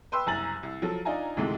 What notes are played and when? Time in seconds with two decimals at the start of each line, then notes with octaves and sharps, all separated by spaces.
0.12 B4 G5 C6 E6
0.26 F#1 C2 G#5 A#5 A6 F#7
0.63 C2
0.82 F3 F#3 A4
1.05 D4 D#4 F4 G#5 A#5
1.37 D2 G#2 C3 E3 G#3 A3